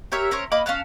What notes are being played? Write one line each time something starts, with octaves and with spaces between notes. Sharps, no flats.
G4 A#4 C#5 E5
C#4 A#4 C5 C#5
A#3 D#5 B5 D6
C#4 F5 A5 F#6